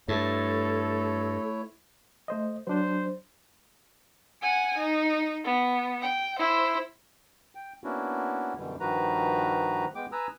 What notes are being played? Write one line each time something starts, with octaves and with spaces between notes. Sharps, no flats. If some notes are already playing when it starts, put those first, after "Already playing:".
G2 A3 E4 A4 C#5
A3 C5 D#5
F#3 D4 C5
F#5 G#5
D#4
B3
G5
E4 C5
G5
A#3 B3 C#4 D4 E4 F#4
F#2 B2 D3 E3 G3
G2 D#3 F3 F#4 B4 A#5
G#3 B3 G5 D6
B4 G#5 A#5 D#6 E6